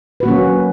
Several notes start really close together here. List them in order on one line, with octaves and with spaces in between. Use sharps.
B4 F#4 A#3 C#4 F#3